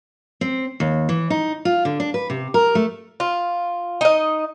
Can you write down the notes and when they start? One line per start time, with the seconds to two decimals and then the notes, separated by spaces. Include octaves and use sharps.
0.41 C4
0.80 D#2
1.09 E3
1.30 D#4
1.65 F4
1.85 D3
2.00 D4
2.14 B4
2.30 C3
2.54 A#4
2.75 A3
3.20 F4
4.01 D#4 D#5